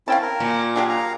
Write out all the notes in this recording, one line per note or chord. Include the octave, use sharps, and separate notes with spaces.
C4 C#4 E4 F5 G5 A5
A#4
A#2
F#3 D4 G4 G#4 F5
F5 A#5